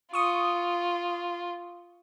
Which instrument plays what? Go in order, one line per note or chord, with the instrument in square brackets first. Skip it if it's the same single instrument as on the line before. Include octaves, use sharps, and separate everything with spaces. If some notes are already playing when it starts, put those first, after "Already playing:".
[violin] F4 [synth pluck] C#6 D#6